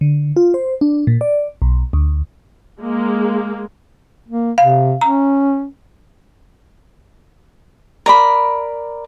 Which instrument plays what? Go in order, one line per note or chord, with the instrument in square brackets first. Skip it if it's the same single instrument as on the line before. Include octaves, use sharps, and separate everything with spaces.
[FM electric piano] D3
F4
C5
D4
A#2
D5
B1
D2
[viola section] G#3 A#3
[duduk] A#3
[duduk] C3 [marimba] F5
[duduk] C#4 [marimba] A#5
[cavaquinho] A#4 D5 B5